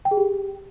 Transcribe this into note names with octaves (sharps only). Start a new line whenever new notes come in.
G5
G#4
G4